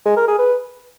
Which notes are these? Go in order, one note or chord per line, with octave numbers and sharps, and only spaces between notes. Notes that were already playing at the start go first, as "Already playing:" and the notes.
G#3
A#4
G#4
B4